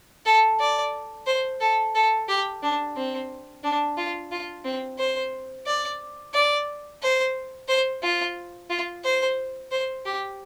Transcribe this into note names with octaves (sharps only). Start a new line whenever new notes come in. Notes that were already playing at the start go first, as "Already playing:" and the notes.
A4
D5
C5
A4
A4
G4
D4
C4
D4
F4
F4
C4
C5
D5
D5
C5
C5
F4
F4
C5
C5
G4